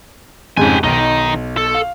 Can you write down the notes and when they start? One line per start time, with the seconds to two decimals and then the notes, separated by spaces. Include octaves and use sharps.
0.57 F2 G#2 C#3 G4 G#5
0.83 B1 D#3 D#4
1.57 A4
1.74 F5